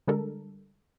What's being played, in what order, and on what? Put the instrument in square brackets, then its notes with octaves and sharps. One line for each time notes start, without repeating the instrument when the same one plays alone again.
[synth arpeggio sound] D3 G3 G#3 D4 A4 A#4